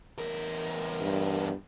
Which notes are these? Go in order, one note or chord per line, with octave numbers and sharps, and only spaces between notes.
E2 A#4
G2